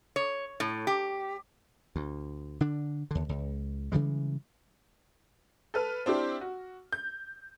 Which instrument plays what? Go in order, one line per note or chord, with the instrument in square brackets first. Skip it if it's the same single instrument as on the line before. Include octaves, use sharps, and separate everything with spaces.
[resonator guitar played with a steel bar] C#5
A2
G4
[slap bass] D2
D3 D4
D#2 D3
C#2
C#3 E3 G3 G#3
[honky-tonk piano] A4 B4 F6
C4 D4 E4 G4
F#4
G6